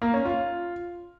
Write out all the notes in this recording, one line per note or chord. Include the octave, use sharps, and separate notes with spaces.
A#3
C#4
F4